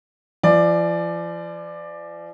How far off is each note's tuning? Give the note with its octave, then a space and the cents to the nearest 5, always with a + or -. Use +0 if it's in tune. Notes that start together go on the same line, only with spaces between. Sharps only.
F3 -40 D5 +15